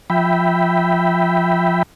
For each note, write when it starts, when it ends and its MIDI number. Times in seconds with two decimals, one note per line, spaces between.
0.10 1.83 53
0.10 1.83 76
0.10 1.83 79
0.10 1.83 83